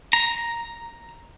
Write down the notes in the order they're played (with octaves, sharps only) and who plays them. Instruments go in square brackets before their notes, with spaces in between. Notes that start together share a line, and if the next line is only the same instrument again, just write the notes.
[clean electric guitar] A#5